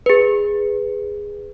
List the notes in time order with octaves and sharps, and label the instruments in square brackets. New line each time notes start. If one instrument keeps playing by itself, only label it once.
[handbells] G#4 B4